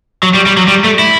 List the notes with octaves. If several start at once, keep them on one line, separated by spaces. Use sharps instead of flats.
F#3
G3
G3
F#3
G3
A3
E4